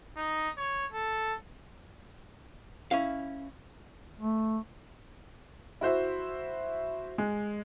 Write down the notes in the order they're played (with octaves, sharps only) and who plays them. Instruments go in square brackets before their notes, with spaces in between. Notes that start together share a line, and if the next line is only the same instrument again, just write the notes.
[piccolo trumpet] D#4
C#5
A4
[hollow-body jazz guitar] C#4 E4 F5
[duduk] A3
[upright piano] E4 F#4 C5 E5
G#3